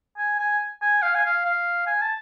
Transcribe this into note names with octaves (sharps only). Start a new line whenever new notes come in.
G#5
G#5
G#5
F5
G#5
F5
F5
G#5
A5